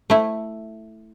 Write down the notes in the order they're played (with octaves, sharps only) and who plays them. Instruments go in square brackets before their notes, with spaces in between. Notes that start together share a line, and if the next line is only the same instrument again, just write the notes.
[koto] A3 E4